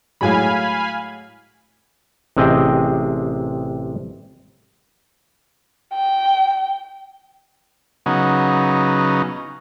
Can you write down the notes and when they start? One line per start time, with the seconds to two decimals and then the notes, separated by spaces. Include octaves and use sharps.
0.21 A2 F#3 G#3 F5 G#5 B5
2.37 A1 C3 C4 G#4 D#5 G5
5.94 G5
8.06 C#3 F#3 B3 D#4